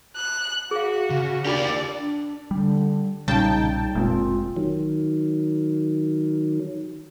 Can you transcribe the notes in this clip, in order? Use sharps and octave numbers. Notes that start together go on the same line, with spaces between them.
F#6
F#4 G#4 F5
C#3
D4 F4 G4 A#4 D5 G5
D4
D3 G3
B1 A#2 C#3 G3 D#4 G5 A5
F1 A#2 G#3 C4 F4
D#3 F#3